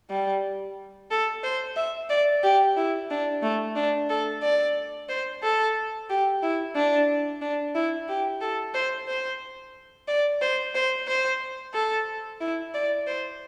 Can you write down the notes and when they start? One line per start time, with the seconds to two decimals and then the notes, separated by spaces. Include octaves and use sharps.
0.10 G3
1.11 A4
1.44 C5
1.76 E5
2.10 D5
2.43 G4
2.77 E4
3.10 D4
3.42 A3
3.76 D4
4.09 A4
4.42 D5
5.09 C5
5.43 A4
6.09 G4
6.43 E4
6.75 D4
7.41 D4
7.75 E4
8.09 G4
8.41 A4
8.74 C5
9.08 C5
10.08 D5
10.41 C5
10.75 C5
11.07 C5
11.74 A4
12.41 E4
12.74 D5
13.07 C5